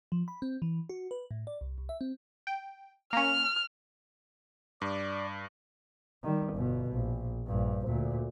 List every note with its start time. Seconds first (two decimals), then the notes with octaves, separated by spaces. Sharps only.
0.12 F3
0.28 B5
0.42 C4
0.62 E3
0.89 F#4
1.11 B4
1.31 A2
1.47 D5
1.61 C2
1.78 C2
1.89 E5
2.01 C4
2.47 G5
3.13 A#3 C#4 F6
4.82 G2 D5
6.23 D#3 G3
6.53 G1 B2
6.92 A#1
7.47 A#1 G2
7.86 D2 A#2